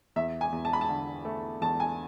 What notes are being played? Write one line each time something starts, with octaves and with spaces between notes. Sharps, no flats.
E2 E5
G#5
E2
A5
B5
A5
D3
A3
E2 A5
G#5